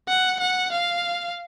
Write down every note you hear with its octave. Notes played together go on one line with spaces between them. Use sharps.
F#5
F#5
F5